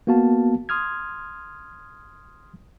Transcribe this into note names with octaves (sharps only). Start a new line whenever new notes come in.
A#3 B3 F#4 F5 A5
C6 D#6 F6 G#6